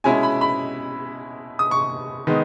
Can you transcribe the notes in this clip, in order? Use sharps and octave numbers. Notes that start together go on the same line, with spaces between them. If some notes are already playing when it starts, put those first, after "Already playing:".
B2 G#3 C#4 E4 G#5
B5
B5
D#6
C#6
D#3 G#3 B3 D#4